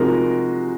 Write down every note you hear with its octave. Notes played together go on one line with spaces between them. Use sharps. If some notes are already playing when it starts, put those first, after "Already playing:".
Already playing: C3 F3 G#3 D#4 F#4 A#4